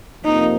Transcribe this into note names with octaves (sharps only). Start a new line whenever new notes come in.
F2 C3 F3 A#3 D#4